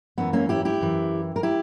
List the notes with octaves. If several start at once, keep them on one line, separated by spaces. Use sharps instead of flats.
F#2 E3 B3
A#3 C#4
E4 G4
E4 G4
F#2 E3
A#4
E4 G4